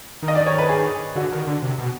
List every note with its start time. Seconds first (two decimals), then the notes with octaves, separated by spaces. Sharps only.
0.23 D#3
0.28 D#5
0.35 D5
0.46 C#5
0.58 B4
0.69 G#4
1.15 D3 F#4
1.32 D#3
1.47 D3
1.62 C3
1.78 B2